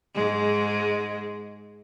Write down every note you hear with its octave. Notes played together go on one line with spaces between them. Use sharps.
G#2 G#3